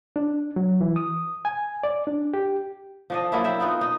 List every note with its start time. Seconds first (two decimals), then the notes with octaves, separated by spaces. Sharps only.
0.16 D4
0.56 F#3
0.81 E3
0.96 D#6
1.45 G#5
1.83 D5
2.07 D4
2.34 G4
3.10 F3 D4 D#5
3.32 F#3 A#3 D4 E4
3.44 E4 A#4 E5 G5
3.60 B3 D#4 F4 F#4
3.81 D#4